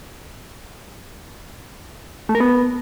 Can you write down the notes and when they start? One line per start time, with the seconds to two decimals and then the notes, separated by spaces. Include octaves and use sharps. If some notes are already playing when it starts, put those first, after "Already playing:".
2.29 A3
2.35 A#4
2.40 B3